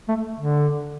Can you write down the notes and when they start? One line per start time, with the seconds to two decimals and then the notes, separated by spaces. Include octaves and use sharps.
0.09 A3
0.39 D3